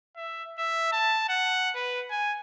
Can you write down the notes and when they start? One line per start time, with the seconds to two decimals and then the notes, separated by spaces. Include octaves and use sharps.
0.17 E5
0.58 E5
0.92 A5
1.29 F#5
1.76 B4
2.10 G#5